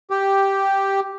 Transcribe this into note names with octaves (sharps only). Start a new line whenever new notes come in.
G4